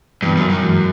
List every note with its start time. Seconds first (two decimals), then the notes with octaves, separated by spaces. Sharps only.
0.22 G2 E3 G3 B3
0.37 F#2
0.50 F#2
0.63 G2 E3 G#3